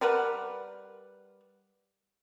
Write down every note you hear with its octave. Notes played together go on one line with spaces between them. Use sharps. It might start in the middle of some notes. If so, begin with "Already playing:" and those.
G3 A#4 B4 F#5